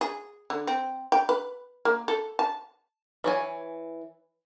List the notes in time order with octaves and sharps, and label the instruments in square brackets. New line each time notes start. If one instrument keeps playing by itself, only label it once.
[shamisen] G#4
D3
C4
G5
B4
A#3
A4
A5
[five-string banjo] E3 C#5 G#5